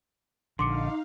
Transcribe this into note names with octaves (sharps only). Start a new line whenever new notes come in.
A#1 D3 D#4 F5 C6 D6 C#7